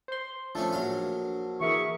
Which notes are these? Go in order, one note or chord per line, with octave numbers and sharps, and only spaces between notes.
C5 C6
F3 A3 C#4 D4 A4
A#1 F#3 F5
E3 G#4 A#4 E5 C#6